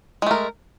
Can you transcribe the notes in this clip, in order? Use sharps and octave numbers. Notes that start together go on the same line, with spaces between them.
G#3 A3 A#4